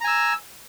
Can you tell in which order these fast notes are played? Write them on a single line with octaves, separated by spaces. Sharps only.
A#5 G#5 E6